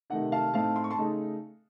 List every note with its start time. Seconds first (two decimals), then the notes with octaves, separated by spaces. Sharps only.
0.10 C3 D#3 A3 D#4 D#5 F#5
0.32 F5 A5
0.54 A2 A3 C4 D#4 F5 A5
0.76 C6
0.84 C#6
0.91 A5 C6
0.99 C#3 A3 D#4